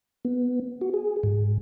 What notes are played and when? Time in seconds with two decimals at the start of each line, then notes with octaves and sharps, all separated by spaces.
0.25 B3
0.81 F#4
0.94 G#4
1.23 G#2